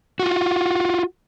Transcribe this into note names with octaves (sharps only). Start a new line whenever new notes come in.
F4 F#4